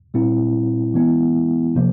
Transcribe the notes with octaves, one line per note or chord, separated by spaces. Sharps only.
A#2 G3 C4 E4
E3 G#3 B3 E4
C3 F3 A#3